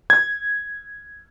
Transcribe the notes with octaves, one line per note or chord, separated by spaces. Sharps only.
G#6